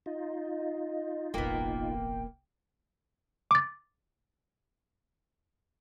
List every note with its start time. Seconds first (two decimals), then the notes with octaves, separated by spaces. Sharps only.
0.06 D#4 F4 D#5
1.34 E1 A1 A#3 B3 G5
3.51 D6 A6